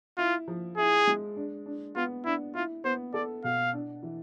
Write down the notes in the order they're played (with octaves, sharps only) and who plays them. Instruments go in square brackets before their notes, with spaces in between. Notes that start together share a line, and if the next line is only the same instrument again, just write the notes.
[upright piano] E4 [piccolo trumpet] F4
[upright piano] F3
[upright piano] E4 [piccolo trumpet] G#4
[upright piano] G#3
D4
D4
[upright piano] B3 [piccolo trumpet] F4
[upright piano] D4 [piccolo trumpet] E4
[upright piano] E4 [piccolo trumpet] F4
[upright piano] B3 [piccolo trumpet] C5
[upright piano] A4 [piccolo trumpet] D5
[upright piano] B2 [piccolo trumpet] F5
[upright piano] D4
E3